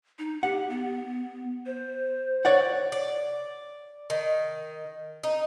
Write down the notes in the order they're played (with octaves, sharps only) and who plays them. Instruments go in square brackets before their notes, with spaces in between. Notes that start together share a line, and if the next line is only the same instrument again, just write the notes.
[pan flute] D#4
[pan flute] G4 [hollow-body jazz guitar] F#5
[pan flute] B3
C5
[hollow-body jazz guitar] C#5 D5 F#5
[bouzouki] D5
D#3
D#4